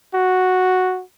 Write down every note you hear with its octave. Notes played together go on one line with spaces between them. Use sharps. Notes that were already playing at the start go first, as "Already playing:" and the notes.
F#4